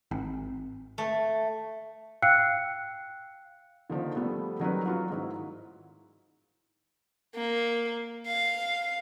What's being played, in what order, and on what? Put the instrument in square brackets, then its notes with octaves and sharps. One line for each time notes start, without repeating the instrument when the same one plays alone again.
[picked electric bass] G#1
[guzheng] A3
[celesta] F5 G5 E6 F#6 C7 C#7
[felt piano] D3 D#3 F3 A#3
F3 G3 A3 B3
D#3 F#3 G3 B4
F#3 F4 F#4
G#2 D#3 E4
[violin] A#3
F5